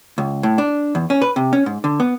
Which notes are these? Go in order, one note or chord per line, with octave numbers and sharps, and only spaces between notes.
C#2
A2
D4
E2
C#4
B4
C3
C#4
G#2
D3
B3